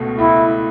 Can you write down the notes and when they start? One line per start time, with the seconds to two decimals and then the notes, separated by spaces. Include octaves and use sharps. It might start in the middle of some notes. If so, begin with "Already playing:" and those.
Already playing: C#2 B2 A3
0.18 C#2 E4